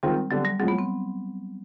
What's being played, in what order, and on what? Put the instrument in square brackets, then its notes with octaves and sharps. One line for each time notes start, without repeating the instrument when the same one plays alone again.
[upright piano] D#3 G#3 C4 F4 [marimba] G3
[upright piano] D3 G3 B3 [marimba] F#3
[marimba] G3
[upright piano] A2 F3 G#3 [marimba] F#3
[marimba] B3
C4